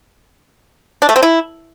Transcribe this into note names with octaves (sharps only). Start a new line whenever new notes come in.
D4
A3
C4
E4